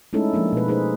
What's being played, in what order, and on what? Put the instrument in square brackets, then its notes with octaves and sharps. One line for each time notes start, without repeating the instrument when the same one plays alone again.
[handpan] G#3 A3 C#4 D#4 E4 A4
F3 G#3 A#3 D4
B2 B4
D#4 G#4 B4 C5